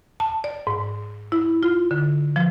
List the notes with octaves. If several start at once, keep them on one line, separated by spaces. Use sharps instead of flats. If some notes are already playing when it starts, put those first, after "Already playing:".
A5
D5
G#2
E4
F4
D3
F3